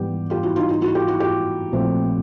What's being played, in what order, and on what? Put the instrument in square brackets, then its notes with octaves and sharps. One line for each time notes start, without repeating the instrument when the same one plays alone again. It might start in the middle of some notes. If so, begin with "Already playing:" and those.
Already playing: [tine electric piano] G#2 E3 G3 B3 [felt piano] G4
[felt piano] F4 G4
E4 F#4
D#4 F4
D#4 F4
E4 F#4
F4 G4
E4 F#4
F4 G4
[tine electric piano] A#1 A#2 F3 A3 C4